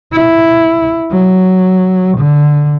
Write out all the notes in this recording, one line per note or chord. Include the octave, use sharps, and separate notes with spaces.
E4
F#3
D3